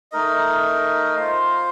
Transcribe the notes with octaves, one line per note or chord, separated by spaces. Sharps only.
A3 D#4 A#4 D#5
F4 C5 F5